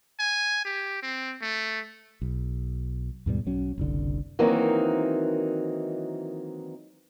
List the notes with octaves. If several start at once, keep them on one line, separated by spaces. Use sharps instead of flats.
G#5
G4
C4
A3
B1
D#2 G#2 B2 G3
B1 F#3 C#4
F#1 C2 D3
D#3 E3 F#3 A#3 C4 D#4